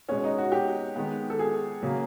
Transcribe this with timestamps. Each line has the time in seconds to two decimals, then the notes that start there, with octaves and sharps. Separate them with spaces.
0.09 B2 G#3 B3 C#4
0.24 D#4
0.38 F#4
0.52 G4
0.96 D#3 G#3 B3
1.30 A4
1.39 G#4
1.83 C#3 F#3 A#3